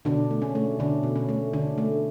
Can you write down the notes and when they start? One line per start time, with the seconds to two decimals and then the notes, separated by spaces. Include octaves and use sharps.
0.05 B2 D3 D4
0.31 A3
0.42 C#4
0.55 A3
0.79 B2 D3 D4
1.03 B2
1.16 C#4
1.29 A3
1.53 D3 D4
1.78 A3